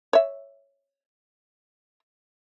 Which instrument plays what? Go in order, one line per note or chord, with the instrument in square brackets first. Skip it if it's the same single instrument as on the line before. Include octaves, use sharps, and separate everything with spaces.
[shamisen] C#5 E5